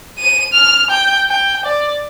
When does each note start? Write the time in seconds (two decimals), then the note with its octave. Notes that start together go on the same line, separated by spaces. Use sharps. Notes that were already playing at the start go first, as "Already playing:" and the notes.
0.19 D#7
0.53 F6
0.91 G5
1.28 G5
1.66 D5